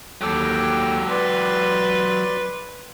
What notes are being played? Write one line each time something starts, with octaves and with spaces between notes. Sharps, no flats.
D#2 F#3 G4 A4 G5
B4 D5 C6